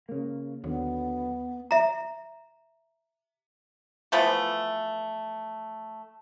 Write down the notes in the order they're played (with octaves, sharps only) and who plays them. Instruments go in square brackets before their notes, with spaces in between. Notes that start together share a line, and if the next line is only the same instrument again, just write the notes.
[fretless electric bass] C#3 A#3
[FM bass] D#2 [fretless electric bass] D3 F#3 [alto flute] B3
[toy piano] E5 A#5
[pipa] E3 F3 A3 B3